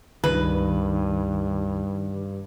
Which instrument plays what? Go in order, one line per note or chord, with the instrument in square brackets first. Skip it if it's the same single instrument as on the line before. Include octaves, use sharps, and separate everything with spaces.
[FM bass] C#2 [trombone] G2 [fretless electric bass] D#3 [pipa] B4